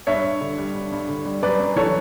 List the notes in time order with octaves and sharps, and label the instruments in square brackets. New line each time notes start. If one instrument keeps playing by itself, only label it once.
[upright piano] G2 C#5 E5
G2
D3
G3
G2
G2
D3
G3
F#2 B4 D5
F#2
E3 A4 C#5